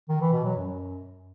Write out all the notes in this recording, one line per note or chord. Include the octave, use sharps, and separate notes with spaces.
D#3
E3
B2
F#3
F#2